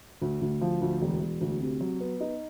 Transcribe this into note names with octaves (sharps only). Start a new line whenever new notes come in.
D2
D2
F3
D2
E1
E1
D2
C3
F#3
B3
D#4